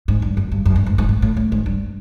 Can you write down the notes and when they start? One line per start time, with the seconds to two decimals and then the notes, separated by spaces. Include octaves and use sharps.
0.08 G#2
0.22 G2
0.37 F#2
0.52 G2
0.66 F#2
0.76 G2
0.86 G#2
0.98 G#2
1.09 G#2
1.22 A2
1.37 A2
1.52 G#2
1.66 G2